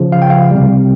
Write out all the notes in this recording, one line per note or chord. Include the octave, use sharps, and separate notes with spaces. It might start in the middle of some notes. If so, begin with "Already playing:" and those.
Already playing: C#3 F3
F5
G5
F5
C3 G3